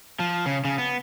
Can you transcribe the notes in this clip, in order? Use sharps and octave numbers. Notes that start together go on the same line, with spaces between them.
F3
C#3
C#3
B3